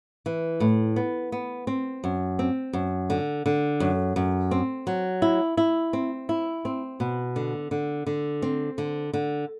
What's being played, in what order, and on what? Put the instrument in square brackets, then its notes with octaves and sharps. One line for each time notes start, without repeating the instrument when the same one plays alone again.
[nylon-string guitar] E3
A2
B3
B3
C4
F#2
C4
F#2
D3
D3
F#2
F#2
C4
F#3
E4
E4
C4
E4
C4
B2
D3
D3
D3
C4
D3
D3